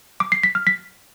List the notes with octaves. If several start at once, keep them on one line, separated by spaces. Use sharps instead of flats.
D6
C7
B6
F6
B6